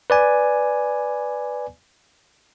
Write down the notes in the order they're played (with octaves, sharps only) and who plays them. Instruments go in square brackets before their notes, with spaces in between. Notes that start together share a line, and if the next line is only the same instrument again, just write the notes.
[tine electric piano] B4 D5 G#5